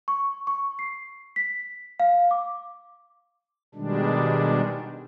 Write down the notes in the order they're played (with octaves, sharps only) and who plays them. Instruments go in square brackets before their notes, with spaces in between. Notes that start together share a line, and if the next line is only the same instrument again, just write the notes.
[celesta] C#6
C#6
C7
B6
F5
D6
[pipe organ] B2 D#3 G3 G#3 D4